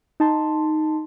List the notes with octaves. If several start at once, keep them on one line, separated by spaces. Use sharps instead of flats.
D#4 A5 C6